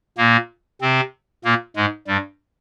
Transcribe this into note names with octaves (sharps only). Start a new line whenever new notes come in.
A#2 A#3
C3 C4
A#2 A#3
G#2 G#3
G2 G3